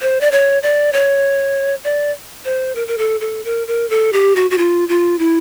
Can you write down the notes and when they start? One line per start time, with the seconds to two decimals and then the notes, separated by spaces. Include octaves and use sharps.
0.01 C5
0.21 D5
0.32 C#5
0.63 D5
0.93 C#5
1.84 D5
2.45 C5
2.76 A#4
2.88 A#4
2.98 A4
3.21 A4
3.45 A#4
3.67 A#4
3.90 A4
4.13 G4
4.36 F#4
4.51 F#4
4.58 F4
4.89 F4
5.19 E4